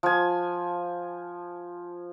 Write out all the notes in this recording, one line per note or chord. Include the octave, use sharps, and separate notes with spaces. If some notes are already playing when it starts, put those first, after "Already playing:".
F3 G#5